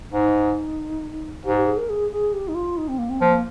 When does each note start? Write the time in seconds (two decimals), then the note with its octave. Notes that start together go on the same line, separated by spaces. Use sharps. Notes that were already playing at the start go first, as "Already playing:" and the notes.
0.13 G#2 D#4
1.45 G#2 G4
1.57 G4
1.67 G#4
1.78 A#4
1.89 G#4
2.12 G#4
2.33 G4
2.48 D#4
2.55 F4
2.77 D#4
2.88 C4
2.99 A#3
3.10 C4
3.21 F3 A#3